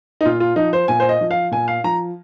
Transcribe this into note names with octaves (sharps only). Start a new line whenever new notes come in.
D#4
A#2 F4
F4
F3 D#4
C5
A#2 G#5
C5
D#5
F3
F5
A#2 G#5
F5
F3 A#5